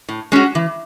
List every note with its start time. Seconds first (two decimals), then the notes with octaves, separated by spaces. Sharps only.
0.09 A2
0.32 G#3 C#4 F#4
0.55 E3